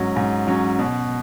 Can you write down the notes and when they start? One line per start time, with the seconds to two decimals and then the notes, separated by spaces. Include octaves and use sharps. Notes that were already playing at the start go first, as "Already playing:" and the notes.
Already playing: G#2 F#3 C#4
0.16 G#2
0.47 F#3 C#4
0.79 B2